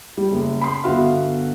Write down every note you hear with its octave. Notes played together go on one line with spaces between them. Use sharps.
G3
F#1
B5 C6
G1 B3 F#4 E5 F5